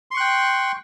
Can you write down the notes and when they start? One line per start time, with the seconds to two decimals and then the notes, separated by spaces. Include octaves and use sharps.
0.11 C6
0.14 C#6
0.17 F#6
0.20 G5